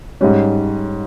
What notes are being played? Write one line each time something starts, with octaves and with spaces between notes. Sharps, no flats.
G#2 G3 C#4